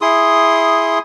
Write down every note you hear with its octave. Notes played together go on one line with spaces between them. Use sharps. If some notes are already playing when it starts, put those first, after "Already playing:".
E4 G#4 C6 D#6